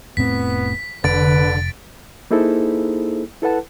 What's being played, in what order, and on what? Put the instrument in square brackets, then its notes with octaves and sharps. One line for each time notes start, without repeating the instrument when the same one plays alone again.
[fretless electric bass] F1 A2 C4 [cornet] B3 [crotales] B6
[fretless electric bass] F1 [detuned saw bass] D3 [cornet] B4 [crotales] A6 D7
[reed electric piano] A#3 D#4 E4 G#4 A4 C5
E4 A4 B4 F#5 A5